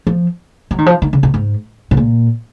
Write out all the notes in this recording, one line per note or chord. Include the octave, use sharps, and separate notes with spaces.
F3
F#3
D#3
F3
D#3
C#3
B2
G#2
B2
A#2